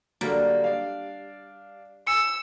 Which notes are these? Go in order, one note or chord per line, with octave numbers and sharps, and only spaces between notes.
D3 F#3 G3 A#3
D4 D5 F5
G#5 E6 C#7